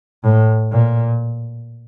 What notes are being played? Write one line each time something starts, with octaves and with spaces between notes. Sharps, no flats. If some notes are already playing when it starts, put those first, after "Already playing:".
A2
A#2